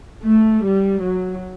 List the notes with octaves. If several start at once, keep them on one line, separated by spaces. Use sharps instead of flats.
A3
G3
F#3